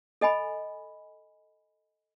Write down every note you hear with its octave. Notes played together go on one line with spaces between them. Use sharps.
A4 D#5 G#5 B5